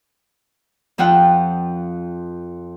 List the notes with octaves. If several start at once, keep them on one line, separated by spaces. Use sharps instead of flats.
F2 F3 F4 F#5 G5